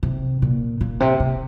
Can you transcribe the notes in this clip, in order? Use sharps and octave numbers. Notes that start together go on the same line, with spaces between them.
C3
A#2
A#2
C3
C3